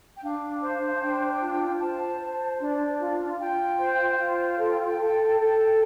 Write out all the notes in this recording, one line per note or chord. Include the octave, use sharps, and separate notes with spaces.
G5
D4 F5
C5
A5
D4 G5
F4
C5 A5
C5
D4
F4
F4 G5
C5
F4 G5
A4
A4
A4